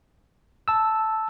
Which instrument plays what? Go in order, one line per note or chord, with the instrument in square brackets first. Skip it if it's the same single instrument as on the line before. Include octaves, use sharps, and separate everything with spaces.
[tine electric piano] A5 E6